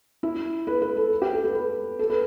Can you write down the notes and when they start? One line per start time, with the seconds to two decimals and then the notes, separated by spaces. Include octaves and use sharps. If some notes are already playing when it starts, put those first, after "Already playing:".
0.23 E4
0.67 B4
0.82 B4
0.97 A4
1.22 G4
1.33 A4
1.44 B4
1.55 B4
1.99 A4
2.10 B4